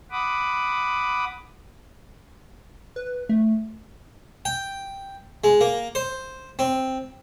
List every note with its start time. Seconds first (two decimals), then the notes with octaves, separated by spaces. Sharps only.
0.11 F#5 B5 D6 D#6
2.96 B4
3.29 A3
4.45 G5
5.44 G#3
5.61 A#3
5.95 C5
6.59 C4